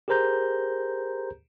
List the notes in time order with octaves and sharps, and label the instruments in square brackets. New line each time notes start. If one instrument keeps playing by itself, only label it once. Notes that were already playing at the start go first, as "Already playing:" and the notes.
[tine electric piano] G4 G#4 A#4 C5 A#5 G6